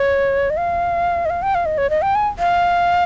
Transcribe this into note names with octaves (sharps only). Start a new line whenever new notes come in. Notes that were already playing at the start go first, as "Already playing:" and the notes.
Already playing: C#5
D#5
F5
D#5
F5
G5
F5
D#5
C#5
D#5
G5
G#5
F5